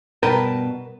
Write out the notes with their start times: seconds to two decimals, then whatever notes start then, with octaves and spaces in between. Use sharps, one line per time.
0.23 G2 B2 A#4 B4 G5 A5